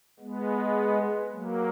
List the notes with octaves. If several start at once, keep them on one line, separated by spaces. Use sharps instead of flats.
G#3 B3
F#3 A#3